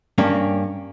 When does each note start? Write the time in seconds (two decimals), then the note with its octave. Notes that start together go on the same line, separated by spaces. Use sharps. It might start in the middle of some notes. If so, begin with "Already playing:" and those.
0.18 G2 A#3 C#4 D4